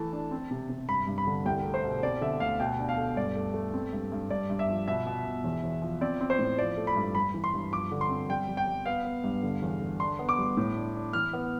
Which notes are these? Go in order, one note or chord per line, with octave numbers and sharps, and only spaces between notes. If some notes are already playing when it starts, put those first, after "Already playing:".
Already playing: E3 A3 A5
D4
C4
C3
C3
G2 B5
G2
B5
D3
C2 G5
A3
C5
B2
C4 D5
D3 E5
D2 F5
B2 G5
D4
F5
A3
G2 D5
A3
A3
C4
G2
G2
G2 D5
G2
E5
F3
B2 E5
B2
B2
E2
E2
F3
C4 D5
C4
C5
A2
F3 D5
A3
B5
G2
G3 B5
E3
C6
G2
F3 D6
D3
C6
C4
G3 G5
G3
G5
G3
B3 F5
B3
G2
D3
E2
D3
D4 C6
B3
D6
G3
A2
D4
D4
E3 F6
B3